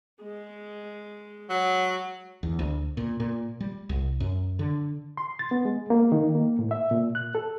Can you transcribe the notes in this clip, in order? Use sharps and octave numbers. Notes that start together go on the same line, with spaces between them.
G#3
F#3
E2
D2
A#2
A#2
G3
C2
F#2
D3
C6
A6
B3
G#3
A#3
D#3
A#3
A2
E5
A#2
F#6
A4